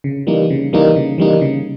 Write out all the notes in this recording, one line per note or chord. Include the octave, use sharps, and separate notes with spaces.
C#3
E3 G3 A#3 D#4
C#3
E3 G3 A#3 D#4
C#3
E3 G3 A#3 D#4
C#3